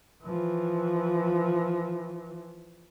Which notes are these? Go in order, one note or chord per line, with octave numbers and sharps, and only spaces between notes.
E3 F3